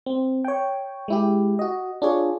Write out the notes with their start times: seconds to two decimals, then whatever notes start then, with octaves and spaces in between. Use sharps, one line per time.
0.06 C4
0.44 C#5 G5
1.08 G#3 E4 G4
1.59 F#4 D#5
2.02 D4 F4 G#4 C#5